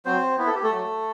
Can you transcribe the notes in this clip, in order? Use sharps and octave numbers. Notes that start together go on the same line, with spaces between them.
F#3 C4 C5
B3 E4 B4
A4
G4
A3 A4
F#3